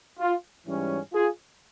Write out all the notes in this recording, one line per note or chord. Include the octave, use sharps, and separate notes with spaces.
F4
G#2 E3 G3 C#4
F4 G#4